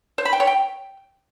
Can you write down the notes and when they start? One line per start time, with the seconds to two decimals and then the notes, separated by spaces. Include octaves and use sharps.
0.18 C5
0.25 B5
0.33 G5
0.40 C#5
0.47 G5